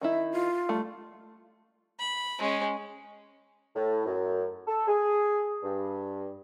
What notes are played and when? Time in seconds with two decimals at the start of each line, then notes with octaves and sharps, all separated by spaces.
0.01 D#3 D#4 E4 E5
0.32 F4
0.69 G3 A3
1.99 B5
2.39 G#3 C#4
3.76 A2
4.06 F#2
4.67 A4
4.87 G#4
5.62 G2